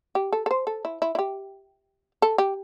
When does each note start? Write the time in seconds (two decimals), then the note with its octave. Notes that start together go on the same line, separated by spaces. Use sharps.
0.15 G4
0.32 A4
0.46 A4
0.51 C5
0.67 A4
0.85 E4
1.02 E4
1.15 E4
1.19 G4
2.22 A4
2.38 G4